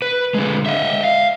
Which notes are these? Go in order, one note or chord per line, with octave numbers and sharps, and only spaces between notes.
B4
D3 G#3
D#5 E5
F5